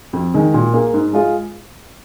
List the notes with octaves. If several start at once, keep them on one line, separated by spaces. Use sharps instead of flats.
F2
D#3 G#3
A#2
A#3 G#4
G#2
G#3 F4 G#4